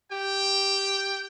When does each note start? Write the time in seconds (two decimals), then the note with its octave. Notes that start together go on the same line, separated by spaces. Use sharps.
0.12 G4 G5